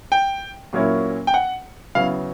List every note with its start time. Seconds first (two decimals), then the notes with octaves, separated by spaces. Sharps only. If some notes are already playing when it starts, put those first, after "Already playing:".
0.12 G5
0.73 A#2 F#3 A#3 C#4 E4
1.27 G5
1.34 F#5
1.95 C#3 F#3 B3 E4 F5